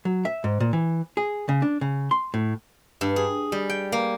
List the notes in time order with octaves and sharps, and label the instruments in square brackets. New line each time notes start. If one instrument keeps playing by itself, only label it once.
[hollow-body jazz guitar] F#3
E5
G#2
A#2
E3
G#4
C#3
D4
C#3
C6
A2
[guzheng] G2
G#4
G3
G5
A#3